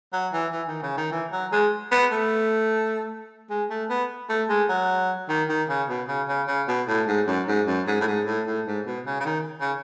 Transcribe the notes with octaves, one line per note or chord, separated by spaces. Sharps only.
F#3
E3
E3
D#3
C#3
D#3
E3
F#3
G#3
B3
A3
G#3
A3
B3
A3
G#3
F#3
D#3
D#3
C#3
B2
C#3
C#3
C#3
B2
A2
G#2
F#2
G#2
F#2
G#2
A2
G#2
A2
A2
G#2
B2
C#3
C#3
D#3
C#3